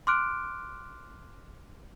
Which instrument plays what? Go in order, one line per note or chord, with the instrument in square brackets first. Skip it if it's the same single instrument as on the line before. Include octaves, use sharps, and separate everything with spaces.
[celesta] C6 D6 F6 F#6 D7